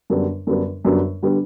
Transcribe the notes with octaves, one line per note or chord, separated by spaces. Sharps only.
F#2 D3 G3 B3 D4
F#2 D3 G3 B3 D4
F#2 D3 G3 B3 D4
D3 G3 B3 D4